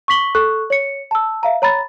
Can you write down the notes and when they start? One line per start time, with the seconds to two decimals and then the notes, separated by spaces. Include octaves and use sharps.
0.08 C#6 D6 B6 F#7 G7
0.35 A4 C#6 F#6
0.70 C#5 C#7
1.11 A5 E6
1.43 E5 F5 A#5
1.62 C#5 A#5 B5 A6